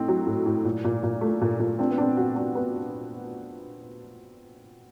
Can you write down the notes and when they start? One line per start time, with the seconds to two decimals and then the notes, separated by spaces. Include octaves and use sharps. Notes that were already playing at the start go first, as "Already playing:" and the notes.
Already playing: A2 C4 D#4
0.08 F#3
0.27 A2
0.46 A2
0.65 A#2
0.84 A#2
1.03 A#2
1.21 A3
1.41 A#2
1.60 A#2
1.79 C4 D4
1.90 B3
1.98 C4 D4
2.17 F#4
2.36 D4
2.55 B3